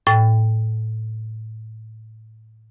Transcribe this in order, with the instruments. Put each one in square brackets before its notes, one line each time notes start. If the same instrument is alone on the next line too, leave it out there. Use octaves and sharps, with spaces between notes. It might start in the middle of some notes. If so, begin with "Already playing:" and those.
[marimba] A2 G5 A6